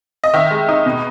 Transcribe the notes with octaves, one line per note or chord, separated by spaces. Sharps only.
D#5
D#3 E5
G#3
D#4
B2